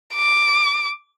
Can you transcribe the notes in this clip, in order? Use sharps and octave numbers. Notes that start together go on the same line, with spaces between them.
D6